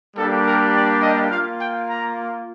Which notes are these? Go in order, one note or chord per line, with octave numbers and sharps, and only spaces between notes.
G3 A#3 D4 G4 A4
A#4
D5
D#5
A#3 F4 F5
G5
A#5